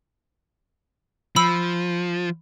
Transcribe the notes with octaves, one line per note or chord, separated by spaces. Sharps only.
F3 B5 E6